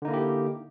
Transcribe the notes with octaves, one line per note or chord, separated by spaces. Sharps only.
D3 A#3 D#4 E4 G4